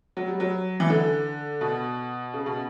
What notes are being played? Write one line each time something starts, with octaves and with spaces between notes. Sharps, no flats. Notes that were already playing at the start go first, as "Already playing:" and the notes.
F#3
G3
F#3
E3
D3
B2
C#3
B2